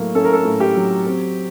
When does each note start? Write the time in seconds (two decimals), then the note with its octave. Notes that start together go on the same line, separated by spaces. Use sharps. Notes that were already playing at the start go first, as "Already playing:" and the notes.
Already playing: A2 F#3 A#3
0.15 C#4 A4
0.25 A#4
0.33 A4
0.45 A2
0.60 G4
0.76 F#3
1.06 C4